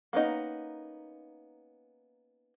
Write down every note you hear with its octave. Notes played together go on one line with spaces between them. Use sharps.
A#3 B3 C#4 D#4